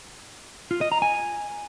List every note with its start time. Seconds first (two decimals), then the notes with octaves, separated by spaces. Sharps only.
0.71 F4
0.81 D#5
0.92 A#5
1.02 G#5